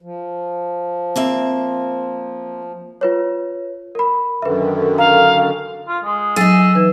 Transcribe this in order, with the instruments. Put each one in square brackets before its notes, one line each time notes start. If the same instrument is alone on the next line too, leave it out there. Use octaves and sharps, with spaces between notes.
[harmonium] F3
[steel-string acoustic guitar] A#3 C4 E5
[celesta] F4 B4 C#5
A#4 B5
[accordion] F#2 D3 D#3 [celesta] B4 E5
[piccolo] F5 [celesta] A#5
[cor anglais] F4
G#3
[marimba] F#3 A6 [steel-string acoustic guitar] D#4 G#4 [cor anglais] E5
[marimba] E3 D#4 B4